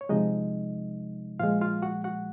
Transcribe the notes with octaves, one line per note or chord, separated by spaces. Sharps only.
C#5
C3 F3 G#3 D#4 D#5
A#2 F3 G#3 F4 F5
F4 F5
F#4 F#5
F#4 F#5